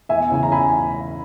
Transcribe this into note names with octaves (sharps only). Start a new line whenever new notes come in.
E2 E5 G#5
C#3 E3 G#5
A#5
G#5 B5